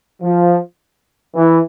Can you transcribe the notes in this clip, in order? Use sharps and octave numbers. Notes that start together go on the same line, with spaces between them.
F3
E3